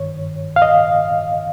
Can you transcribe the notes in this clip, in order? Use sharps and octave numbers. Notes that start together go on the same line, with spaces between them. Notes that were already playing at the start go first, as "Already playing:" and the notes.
Already playing: G2 D#3 C#5
F5
D#5